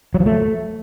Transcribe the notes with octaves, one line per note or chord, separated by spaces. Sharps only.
F#3
F3
A3